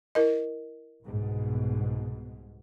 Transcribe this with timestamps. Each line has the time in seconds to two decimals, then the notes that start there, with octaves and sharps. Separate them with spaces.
0.15 E4 A#4 D#5
1.02 C2 G#2 B2